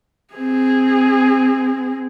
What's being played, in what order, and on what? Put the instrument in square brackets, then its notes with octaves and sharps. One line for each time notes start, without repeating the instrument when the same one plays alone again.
[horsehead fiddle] C4 G#4